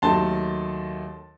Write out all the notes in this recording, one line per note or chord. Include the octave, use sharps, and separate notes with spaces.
D#2 D#3 F#3 A3 A5 C6